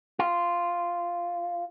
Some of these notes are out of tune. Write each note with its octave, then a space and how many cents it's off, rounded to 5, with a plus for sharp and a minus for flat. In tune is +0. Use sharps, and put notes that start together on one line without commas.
F4 -5